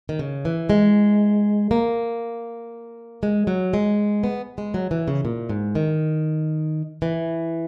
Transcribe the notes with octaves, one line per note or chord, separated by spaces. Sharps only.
D#3
C#3
E3
G#3
A#3
G#3
F#3
G#3
B3
G#3
F#3
E3
C#3
A#2
G#2
D#3
E3